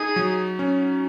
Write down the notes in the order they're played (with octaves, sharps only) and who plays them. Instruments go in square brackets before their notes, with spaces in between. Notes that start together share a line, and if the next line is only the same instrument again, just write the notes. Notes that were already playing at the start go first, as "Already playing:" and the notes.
Already playing: [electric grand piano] D#4 [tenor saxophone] G#4
[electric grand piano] F#3
C#4